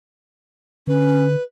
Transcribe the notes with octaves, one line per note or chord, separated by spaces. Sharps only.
D3 C#4 B4